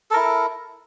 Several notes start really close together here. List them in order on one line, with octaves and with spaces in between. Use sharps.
A4 A#4 E4